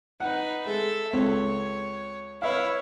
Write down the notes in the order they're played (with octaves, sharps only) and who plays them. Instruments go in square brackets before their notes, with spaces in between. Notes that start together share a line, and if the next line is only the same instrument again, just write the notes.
[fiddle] D#4 B4 [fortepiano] F#5
[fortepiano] G#3 [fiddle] A4 E5
[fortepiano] C#2 C4 A4 [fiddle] C#5
[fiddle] E4 C#5 [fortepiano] B4 E5 F5